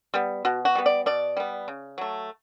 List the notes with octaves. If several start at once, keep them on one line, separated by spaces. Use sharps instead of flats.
G3 B3
B2 F#4
F#4
G3 B3
D5
B2 D5
G3 B3
C#3
F#3 A3